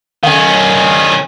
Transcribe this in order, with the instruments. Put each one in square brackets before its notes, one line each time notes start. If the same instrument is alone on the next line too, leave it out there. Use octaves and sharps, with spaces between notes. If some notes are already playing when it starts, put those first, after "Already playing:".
[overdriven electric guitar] D#3 C#4 [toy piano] F5